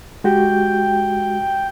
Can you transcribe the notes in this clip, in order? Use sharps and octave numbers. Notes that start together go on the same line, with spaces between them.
G#3 F#4 G4 G5